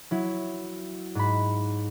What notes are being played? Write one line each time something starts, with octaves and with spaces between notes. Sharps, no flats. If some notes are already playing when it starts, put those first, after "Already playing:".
F#3 E4
G#2 B5